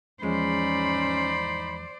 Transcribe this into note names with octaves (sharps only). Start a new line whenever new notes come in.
E2 F3 G#3 C#4 D#4 C5 D5 B5